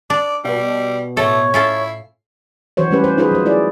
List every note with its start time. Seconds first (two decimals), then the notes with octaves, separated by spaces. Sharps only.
0.10 D4 D5
0.45 B2 G3
1.17 A2 A3 A4 C#5
1.54 C#4 E4 F4 A4 C7
2.77 E3 F#3 F#4 C5 C#5
2.91 G3 A3 C#4 G4 B4
3.04 C5
3.17 D#4 F4 G#4 B4 C5
3.31 F#3 C5
3.45 A3 E4 G#4 D5